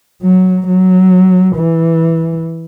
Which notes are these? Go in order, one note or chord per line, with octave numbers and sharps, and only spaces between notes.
F#3
F#3
E3